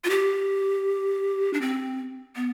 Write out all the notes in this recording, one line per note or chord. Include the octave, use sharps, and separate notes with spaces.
F4
G4
D4
C4
B3